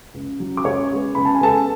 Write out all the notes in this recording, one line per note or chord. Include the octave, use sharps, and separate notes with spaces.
C#2
C#3 F#3
D6
C#2 C#5 C#6
C#3 G#3 B3
C#2 B5
A5
G#5
C#3 G#3 B3 A4 A5